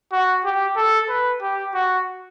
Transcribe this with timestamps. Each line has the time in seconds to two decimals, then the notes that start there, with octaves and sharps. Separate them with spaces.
0.12 F#4
0.45 G4
0.77 A4
1.09 B4
1.42 G4
1.75 F#4